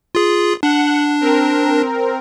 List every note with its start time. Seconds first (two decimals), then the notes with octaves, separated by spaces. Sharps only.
0.15 F4 G#4
0.63 D4 F#5
1.21 C4 A#4